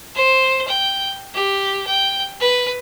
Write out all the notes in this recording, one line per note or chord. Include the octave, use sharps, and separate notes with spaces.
C5
G5
G4
G5
B4